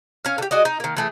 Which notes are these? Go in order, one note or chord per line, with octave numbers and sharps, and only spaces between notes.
C#4 F5
D3 G4
G#3 F#4 D5 D#5
D#4
D#3 A#3
E3 A3 G#4